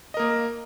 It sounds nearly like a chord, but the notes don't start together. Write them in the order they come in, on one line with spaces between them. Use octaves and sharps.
D#5 A#4 A#3